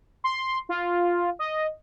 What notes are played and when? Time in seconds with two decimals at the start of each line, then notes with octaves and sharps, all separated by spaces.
0.24 C6
0.69 F4
1.39 D#5